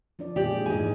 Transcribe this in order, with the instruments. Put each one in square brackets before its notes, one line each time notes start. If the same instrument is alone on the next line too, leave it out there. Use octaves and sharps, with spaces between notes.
[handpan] F3 D4 D5
[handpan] A#2 G#3 G#4 [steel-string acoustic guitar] G4 D5
[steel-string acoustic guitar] G#2 G#5 [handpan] E3 F3